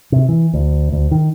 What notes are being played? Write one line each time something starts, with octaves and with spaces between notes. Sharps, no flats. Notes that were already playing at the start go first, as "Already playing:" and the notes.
C3
E3
D2
D2
D#3